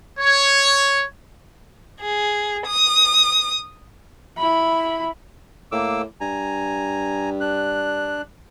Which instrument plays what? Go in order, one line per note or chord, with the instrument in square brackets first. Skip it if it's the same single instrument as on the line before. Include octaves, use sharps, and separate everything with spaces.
[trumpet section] C#5
[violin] G#4
D#6
[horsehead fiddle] E4 B5
[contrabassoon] A2 [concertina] A#3 D6 E6
[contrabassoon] G2 [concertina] G#5 A#5
[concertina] D4 F#6